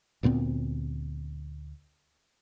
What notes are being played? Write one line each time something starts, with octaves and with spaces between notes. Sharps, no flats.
D2 A#2 B3 C4